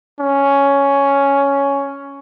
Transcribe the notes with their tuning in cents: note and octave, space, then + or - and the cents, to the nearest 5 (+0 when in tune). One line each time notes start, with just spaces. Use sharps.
C#4 +5